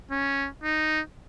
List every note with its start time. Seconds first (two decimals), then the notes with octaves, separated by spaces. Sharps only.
0.10 C#4
0.63 D#4